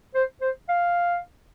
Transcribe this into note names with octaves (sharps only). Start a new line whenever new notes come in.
C5
C5
F5